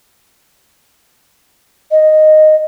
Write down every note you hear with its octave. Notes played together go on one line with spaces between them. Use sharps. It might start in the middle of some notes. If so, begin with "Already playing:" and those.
D#5